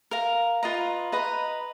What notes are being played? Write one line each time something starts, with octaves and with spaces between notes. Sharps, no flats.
A#4 F5 A#5
F4 B4 D#5 A#5
B4 D#5 A#5